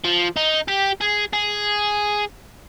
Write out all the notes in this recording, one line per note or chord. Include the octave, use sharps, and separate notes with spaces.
F3
D#4
G4
G#4
G#4